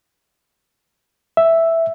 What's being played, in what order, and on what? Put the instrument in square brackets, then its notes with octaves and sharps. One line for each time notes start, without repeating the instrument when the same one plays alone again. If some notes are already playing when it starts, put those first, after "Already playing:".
[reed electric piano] E5